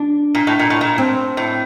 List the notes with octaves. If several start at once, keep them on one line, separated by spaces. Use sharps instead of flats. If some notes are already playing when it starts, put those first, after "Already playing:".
Already playing: D4
A#2
A2
A#2
A2
A#2
C4
A2